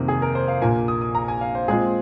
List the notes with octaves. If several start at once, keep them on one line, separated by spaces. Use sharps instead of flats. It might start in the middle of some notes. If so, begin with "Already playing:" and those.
Already playing: F2 C3 D#3 A#3
G#4
A#4
C5
F5
A#1 A#2 A#3 F4 G#5
D#6
D#6
A#5
G#5
F5
C5
A#2 G#3 C4 F4 G#4